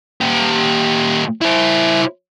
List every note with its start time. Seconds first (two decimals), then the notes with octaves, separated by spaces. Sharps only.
0.21 A#2 G4
1.41 E4 C5